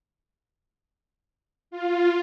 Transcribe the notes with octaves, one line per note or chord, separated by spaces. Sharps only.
F4